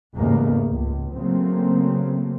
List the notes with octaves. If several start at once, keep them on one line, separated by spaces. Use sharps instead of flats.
A1 E2 G#2 C#3 A3 A#3
C#2
C#3 F#3 A3 A#3 C4